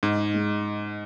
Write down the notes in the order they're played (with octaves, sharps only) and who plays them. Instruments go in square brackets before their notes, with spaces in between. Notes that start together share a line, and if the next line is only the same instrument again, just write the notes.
[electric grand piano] G#2 [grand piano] D#4
[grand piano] G#3